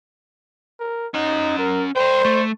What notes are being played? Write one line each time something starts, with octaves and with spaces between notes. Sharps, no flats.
A#4
C#4 D#4 F#5
A#4
B4 C5 G5
A3